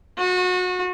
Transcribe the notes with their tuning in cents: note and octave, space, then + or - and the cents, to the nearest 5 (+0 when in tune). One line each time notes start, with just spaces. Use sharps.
F#4 -30